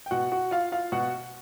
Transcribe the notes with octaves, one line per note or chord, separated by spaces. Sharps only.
G5
B2 F#4 F#5
F#4 F#5
F4 F5
F4 F5
B2 F#4 F#5